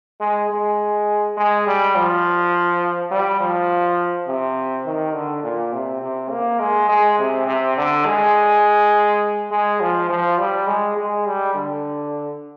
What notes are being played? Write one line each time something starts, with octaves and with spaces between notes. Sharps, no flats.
G#3
G#3
G#3
G3
F3
G3
F3
C3
D#3
D3
A#2
C3
C3
A#3
G#3
G#3
C3
C3
D3
G#3
G#3
F3
F3
G3
G#3
G#3
G3
D3